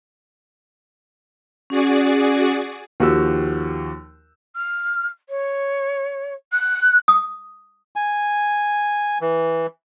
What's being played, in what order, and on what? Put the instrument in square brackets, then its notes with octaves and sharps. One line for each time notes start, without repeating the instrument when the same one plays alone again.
[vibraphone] C#4 [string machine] F#4 G#4 D5
[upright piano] D#2 F3 F#4 G4 E6
[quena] F6
C#5
F#6
[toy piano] D#6
[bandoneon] G#5
E3